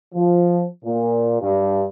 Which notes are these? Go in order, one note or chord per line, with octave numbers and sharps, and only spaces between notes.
F3
A#2
G2